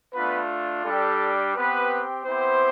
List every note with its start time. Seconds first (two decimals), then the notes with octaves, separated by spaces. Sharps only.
0.14 A3 B3 D4 F4 B4
0.85 G3 D4 G4 A4
1.55 B3 C4 G4 B4
2.25 B3 C4 E4 G4 C5